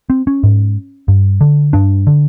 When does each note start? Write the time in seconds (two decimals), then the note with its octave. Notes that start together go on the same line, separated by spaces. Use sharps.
0.10 C4
0.27 C#4
0.43 G#2
1.08 G2
1.41 D3
1.73 G2 D4
2.07 D3